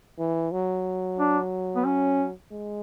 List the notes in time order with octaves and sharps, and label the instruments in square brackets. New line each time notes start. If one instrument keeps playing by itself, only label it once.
[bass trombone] E3
F#3
[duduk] D4
B3
C#4
[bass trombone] G#3